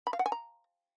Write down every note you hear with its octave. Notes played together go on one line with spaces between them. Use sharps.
B5
F5
F#5
G#5
A#5